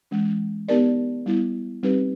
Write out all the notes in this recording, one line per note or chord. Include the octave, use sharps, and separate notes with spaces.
E3 G#3 C#4
B3 D#4 G4 A#4 D5
G3 B3 E4
G3 C4 D#4 G4 B4